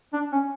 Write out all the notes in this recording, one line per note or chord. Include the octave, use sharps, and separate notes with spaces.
D4
C#4